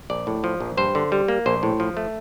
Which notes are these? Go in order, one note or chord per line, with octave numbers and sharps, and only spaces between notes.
A#1 D5
A2
F3
A#1
G2 C5
D3
G3
A#3
A#1 C5
A2
F3
A3